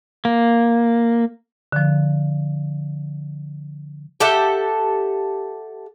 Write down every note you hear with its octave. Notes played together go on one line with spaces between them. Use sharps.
A#3
D3 F3
G4 A4 E5 F#5